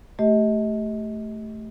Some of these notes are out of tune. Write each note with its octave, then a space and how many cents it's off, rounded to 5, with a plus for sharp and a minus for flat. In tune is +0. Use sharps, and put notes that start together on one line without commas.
A3 +0 G4 +0 D#5 +35